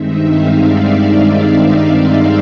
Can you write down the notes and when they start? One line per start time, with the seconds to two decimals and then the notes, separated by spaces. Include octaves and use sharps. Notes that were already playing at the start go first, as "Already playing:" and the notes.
Already playing: G2 D#3 G#3 C4 D#4 E5
0.23 F5
0.57 D5
1.94 C5